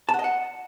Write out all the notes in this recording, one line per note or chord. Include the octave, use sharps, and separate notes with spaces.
A5
F#5
D#5
F#5